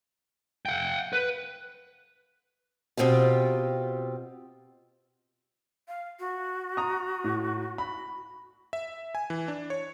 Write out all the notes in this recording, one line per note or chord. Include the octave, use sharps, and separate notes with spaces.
F#5 G5
B4
B2 C4 F4 G4
F5
F#4
A#5 D#6
A2
B5
E5
G#5
E3
D4
C#5